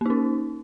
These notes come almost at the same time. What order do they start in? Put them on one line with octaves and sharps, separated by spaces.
A#3 D#4 C#4